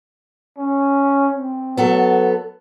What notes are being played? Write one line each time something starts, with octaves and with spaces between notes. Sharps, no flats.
C#4
C4
F#3 B3 A4